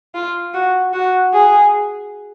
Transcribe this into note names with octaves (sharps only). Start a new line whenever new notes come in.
F4
F#4
F#4
G#4